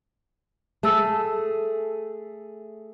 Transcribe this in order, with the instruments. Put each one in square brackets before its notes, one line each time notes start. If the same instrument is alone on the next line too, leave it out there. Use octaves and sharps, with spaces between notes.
[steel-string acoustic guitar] A3 G#4 [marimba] A5 E6